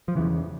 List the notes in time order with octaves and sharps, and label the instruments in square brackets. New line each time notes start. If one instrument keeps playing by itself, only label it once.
[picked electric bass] F3
E2 C#3 E3